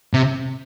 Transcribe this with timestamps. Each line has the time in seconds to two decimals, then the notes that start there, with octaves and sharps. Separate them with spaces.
0.14 C3